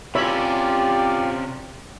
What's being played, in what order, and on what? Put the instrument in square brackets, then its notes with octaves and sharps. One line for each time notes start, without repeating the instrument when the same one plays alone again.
[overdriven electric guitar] C3 C#4 [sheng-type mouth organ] F4 D5 [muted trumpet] G4 [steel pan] C#5 E5 B5